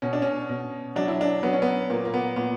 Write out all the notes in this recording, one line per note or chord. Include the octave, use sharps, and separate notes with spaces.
B2 C#4
D4
C#4
B2
F#3 D4
E4
D4
F#3 B3
C#4
B3
A#2 A#3
A#3
B3
A#2 B3